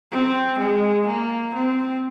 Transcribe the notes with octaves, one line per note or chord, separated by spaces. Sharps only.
C4
G#3
A#3
C4